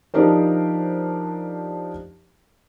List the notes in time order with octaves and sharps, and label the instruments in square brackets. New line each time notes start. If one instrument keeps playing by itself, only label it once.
[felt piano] F3 D4 D#4 G4 A#4 C5